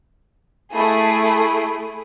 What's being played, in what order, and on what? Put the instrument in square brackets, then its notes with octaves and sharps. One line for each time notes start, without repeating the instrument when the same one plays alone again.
[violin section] A3 G#4 [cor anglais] E4